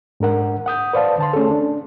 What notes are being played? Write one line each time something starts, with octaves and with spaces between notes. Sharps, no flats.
G#2 D4 A#4 F#5
F#5 D#6 G6
B4 C5 D5 F5 A5
D3 A5 C6
A3 C#4 G#4 A4
D4